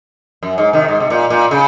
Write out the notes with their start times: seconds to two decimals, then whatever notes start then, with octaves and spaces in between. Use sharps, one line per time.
0.43 F#2
0.58 G#2
0.73 C3 D#3
0.88 G#2
1.00 C3
1.10 A#2
1.30 A#2
1.51 C#3